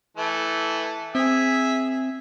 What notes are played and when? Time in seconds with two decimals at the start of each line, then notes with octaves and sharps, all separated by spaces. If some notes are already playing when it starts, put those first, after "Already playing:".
0.17 E3 A3
1.15 C4 G#4 E5